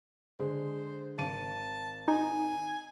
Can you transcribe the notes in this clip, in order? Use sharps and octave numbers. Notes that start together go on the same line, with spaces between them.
D3 G#3 C5
G#1 A5 D#7
D#4 G#5